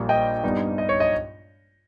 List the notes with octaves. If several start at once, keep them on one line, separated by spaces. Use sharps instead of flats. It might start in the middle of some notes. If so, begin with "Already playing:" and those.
Already playing: A#1 A#2 G3 A#3
D#5 G5
G2 G3 B3 D#4
D#5
C#5
D#5